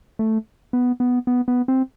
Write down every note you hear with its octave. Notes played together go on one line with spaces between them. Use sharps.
A3
B3
B3
B3
B3
C4